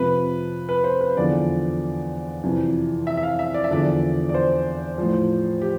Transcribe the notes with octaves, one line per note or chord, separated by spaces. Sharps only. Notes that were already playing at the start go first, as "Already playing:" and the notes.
Already playing: F2 C3 F3 B4
B4
C5
B4
E2 D3 F3 D5
F2 C3 E3
E5
E5
F5
E5
D5
E5
E2 D3 F3 D5
D5
C5
A2 F3
G4